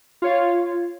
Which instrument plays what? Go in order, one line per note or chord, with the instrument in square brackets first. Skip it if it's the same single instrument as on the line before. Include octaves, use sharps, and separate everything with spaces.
[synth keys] F4 C#5 F5